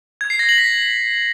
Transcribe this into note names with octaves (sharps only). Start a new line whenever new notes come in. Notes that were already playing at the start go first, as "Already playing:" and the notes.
G#6
C7
A#6
F#7
B6